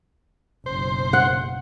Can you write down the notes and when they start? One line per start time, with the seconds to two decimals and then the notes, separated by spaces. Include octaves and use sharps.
0.66 F#1 B1 C5
1.13 F#5